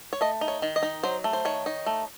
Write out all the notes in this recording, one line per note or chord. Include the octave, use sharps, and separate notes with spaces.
C#5
A3 D#5
D#4
C#5
D#3
D#5
D#4
F#3 C5
A3
C5
D#3 C#5
D#4
A3